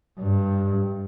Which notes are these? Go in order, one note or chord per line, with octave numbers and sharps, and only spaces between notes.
G2